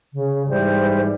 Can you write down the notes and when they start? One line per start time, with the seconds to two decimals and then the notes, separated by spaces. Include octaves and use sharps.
0.13 C#3
0.49 G#2 E3 G3 C5